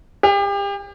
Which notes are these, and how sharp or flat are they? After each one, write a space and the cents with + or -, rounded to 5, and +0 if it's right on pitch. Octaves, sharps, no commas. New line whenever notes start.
G4 +35